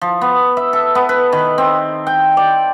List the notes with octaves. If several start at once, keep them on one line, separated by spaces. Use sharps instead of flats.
F3
B3
E5
A4
B3
B4
D#3
C4
G5
D5